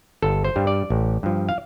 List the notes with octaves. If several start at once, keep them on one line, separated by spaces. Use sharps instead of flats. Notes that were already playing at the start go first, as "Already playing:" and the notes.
G1 A4
C5
G2 G3
D5
A1
G2 F3
F5